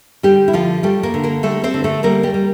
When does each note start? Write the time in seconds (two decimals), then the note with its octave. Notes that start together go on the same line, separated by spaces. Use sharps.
0.23 D3 G3 G4
0.48 E4
0.53 D3 F3 F4
0.83 G3 A3 G4
1.03 A#3 A#4
1.14 D3
1.24 A#3 A#4
1.43 G3 A3 A4
1.64 C4 C5
1.74 D3
1.84 A3 A4
2.03 G3 A#3 A#4
2.23 G3 G4
2.34 G3